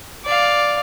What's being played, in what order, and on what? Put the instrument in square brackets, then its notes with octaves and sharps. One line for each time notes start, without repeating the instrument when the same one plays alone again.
[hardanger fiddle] D5 F5